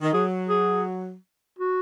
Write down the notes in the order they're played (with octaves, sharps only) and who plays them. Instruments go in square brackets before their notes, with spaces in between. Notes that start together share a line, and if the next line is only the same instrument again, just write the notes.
[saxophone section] D#3
[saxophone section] F#3 [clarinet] G#4
[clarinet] G#4
F#4